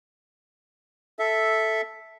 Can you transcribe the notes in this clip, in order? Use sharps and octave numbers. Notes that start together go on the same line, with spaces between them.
A4 E5